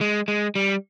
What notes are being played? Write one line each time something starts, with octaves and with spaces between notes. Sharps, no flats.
G#3
G#3
G3